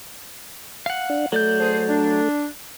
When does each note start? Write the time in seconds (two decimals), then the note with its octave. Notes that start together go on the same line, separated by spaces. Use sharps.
0.86 F5 F#5
1.10 D4
1.32 F#3 A3 D5 G6
1.59 D4 G#4 C5
1.88 D4